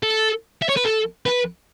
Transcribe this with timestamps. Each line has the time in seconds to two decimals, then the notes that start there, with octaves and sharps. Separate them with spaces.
0.03 A4
0.62 E5
0.69 C#5
0.77 B4
0.85 A4
1.26 B4